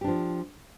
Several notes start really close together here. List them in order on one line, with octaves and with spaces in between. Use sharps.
G4 D4 F3